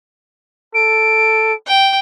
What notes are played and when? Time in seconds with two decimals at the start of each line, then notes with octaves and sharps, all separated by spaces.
0.75 A4 D7
1.67 G5